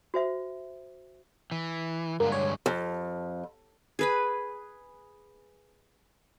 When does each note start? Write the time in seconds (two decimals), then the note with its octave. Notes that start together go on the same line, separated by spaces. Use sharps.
0.14 F#4 C5 E5
1.51 E3
2.20 G2 D3 G#3 A#3
2.32 C#5
2.66 F2
3.99 G#4 B4 B5